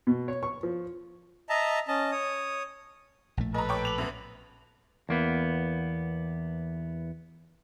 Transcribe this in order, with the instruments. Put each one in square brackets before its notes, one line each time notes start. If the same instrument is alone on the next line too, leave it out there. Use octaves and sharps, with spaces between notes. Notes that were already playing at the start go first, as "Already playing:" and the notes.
[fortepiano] B2
C#5
C#6
F3
[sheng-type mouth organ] D#5 E5 A5 A#5
C#4 D#5 A5
C#5 D#6
[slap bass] A#1 A2 A3
[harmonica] A4 B4 [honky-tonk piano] D#5 A#5
[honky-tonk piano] C#5 G5 D6
F7 F#7
F#2 B3
[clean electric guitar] E2 A#3 B3